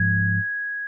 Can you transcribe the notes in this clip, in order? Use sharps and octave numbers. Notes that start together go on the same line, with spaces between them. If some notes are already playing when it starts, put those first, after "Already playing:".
Already playing: G#2 F3 G#6